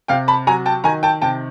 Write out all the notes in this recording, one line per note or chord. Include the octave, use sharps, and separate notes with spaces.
C3 F5 G5
A5 B5
F#3 G#5 A#5
G5 A5
D#3 G#5 A#5
G5 A5
C3 G5 A5